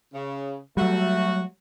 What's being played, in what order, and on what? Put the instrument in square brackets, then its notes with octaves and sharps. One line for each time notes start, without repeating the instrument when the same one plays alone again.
[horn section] C#3
[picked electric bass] F#3 G3 [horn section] A3 F#4